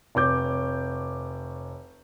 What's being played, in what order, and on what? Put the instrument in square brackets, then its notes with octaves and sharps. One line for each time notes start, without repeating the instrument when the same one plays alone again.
[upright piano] F1 C#5 D6 G6